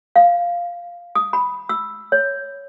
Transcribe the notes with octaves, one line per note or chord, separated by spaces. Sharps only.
F5
D#6
B5
E6
C#5